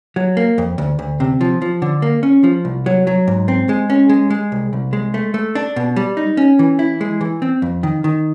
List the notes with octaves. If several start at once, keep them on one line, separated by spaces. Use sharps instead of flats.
F#3
A#3
F2
D2
D2
C3
F3
F3
D3
A#3
C#4
F3
C2
F#3
F#3
G#2
C4
G#3
C#4
G#3
G#3
C2
C2
G#3
A3
A3
D4
B2
G3
D#4
C#4
E3
E4
G#3
E3
C4
F2
D#3
D#3